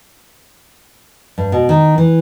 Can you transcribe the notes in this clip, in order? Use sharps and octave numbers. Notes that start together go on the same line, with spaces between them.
G2
B2
D#3
E3